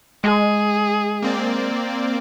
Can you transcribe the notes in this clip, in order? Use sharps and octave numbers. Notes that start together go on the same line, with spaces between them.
G#3 G#4
A#3 C4 D5